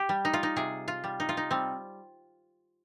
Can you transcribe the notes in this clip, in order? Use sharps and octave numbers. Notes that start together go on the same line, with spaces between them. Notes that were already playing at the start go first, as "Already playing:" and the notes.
Already playing: G4
G3
D#4
F4
D#4
C3 G#4
F4
G3
D#4
F4
D#4
G3 C4